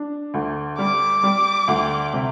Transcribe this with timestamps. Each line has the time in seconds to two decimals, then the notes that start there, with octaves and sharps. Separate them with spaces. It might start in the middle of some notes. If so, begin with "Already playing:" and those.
Already playing: D4
0.34 D2
0.78 G3 D6
1.23 G3
1.68 D2
2.13 C3